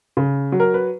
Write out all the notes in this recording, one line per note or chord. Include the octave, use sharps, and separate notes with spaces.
C#3
F#3
A#4
B4